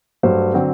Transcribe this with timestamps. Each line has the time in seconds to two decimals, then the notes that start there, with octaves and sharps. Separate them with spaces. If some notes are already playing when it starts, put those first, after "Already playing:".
0.23 G2 F#3 A3 C5
0.54 D3 F#3 C4